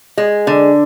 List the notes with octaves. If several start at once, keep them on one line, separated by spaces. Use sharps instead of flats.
G#3
D3